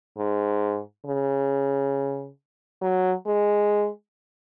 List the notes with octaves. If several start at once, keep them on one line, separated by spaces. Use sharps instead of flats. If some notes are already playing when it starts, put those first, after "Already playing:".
G#2
C#3
F#3
G#3